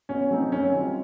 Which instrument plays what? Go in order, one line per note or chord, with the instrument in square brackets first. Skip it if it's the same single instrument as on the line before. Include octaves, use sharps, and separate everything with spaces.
[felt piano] B2 [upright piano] C#4
[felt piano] F#3 A3 C4 D#4
[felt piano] F#2 [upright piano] C#4
[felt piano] D#3 G3 C4 F4